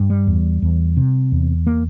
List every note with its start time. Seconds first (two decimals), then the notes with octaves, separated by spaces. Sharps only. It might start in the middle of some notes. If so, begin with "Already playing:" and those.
Already playing: G2
0.10 G3
0.27 E2
0.62 E2
0.97 C3
1.32 E2
1.67 A#3